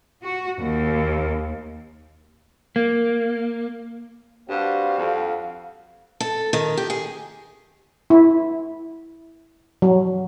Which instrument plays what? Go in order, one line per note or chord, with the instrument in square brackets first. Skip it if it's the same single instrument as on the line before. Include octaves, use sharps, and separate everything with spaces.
[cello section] F#4
D#2
[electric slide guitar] A#3
[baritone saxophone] G2 [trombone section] G3 C4 F#4 [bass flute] F5
[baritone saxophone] F2
[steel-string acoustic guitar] A4
D#3
G4
G#4
[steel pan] E4
F#3